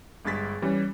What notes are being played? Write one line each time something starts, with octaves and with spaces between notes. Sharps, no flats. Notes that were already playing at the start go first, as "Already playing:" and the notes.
G1 G2 G#3 A6 B6
E3 G3 C#4